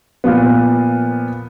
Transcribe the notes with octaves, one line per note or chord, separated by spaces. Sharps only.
A#2 F3 B3